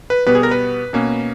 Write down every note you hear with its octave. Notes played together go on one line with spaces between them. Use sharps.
B4
B2 G3 B3 B4
G#4
A#4
B4
B2 A#3 C#4